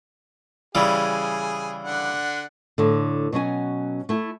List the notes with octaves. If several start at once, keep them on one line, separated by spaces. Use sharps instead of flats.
C#3 E3 G3 G#4
D3 D4 F#5
A2 D3
B2 F#3 C#4 G#5
A3 E4